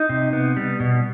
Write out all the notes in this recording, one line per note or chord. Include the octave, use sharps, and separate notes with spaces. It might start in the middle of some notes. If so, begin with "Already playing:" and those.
Already playing: D#4
C3
B3
G3
B2